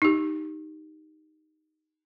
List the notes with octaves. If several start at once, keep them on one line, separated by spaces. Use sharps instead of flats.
D#4 G4